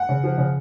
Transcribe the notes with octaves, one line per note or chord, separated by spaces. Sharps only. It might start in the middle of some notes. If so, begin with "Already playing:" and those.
Already playing: F#5
C#3
F3
C#3